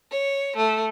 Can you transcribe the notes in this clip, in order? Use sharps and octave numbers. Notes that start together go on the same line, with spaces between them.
C#5
A3